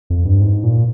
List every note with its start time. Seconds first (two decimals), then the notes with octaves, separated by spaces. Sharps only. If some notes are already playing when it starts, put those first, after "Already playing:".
0.10 F2
0.25 G2
0.41 G#2
0.64 A#2